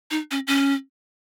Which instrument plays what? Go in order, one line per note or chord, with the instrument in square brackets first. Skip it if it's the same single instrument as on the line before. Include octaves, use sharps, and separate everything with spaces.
[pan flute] D#4
C#4
C#4